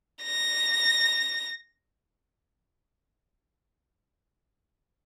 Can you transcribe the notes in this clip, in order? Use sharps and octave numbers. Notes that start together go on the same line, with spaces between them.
A#6